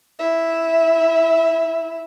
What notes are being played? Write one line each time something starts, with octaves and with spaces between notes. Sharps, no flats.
E4 E5